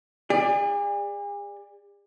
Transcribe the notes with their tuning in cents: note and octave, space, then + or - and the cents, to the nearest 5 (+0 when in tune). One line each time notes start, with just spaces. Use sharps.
G#4 -40 D5 +15